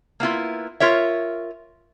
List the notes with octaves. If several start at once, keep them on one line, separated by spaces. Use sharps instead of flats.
A#3 B3 E4 F4
F4 A#4 C#5 E5